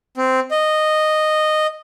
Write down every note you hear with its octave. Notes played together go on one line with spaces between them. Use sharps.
C4
D#5